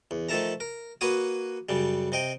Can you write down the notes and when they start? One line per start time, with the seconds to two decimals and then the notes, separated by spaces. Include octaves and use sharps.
0.11 E2
0.29 D#3 F3 A3 A4 E5 A#5
0.60 A#4
1.01 A#3 F#4 B4 C#5 D#6
1.69 F#2 C#3 G3
2.12 C3 D#5 G5